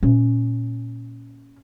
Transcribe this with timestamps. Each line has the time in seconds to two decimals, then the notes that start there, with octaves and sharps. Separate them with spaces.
0.03 A#2 C#4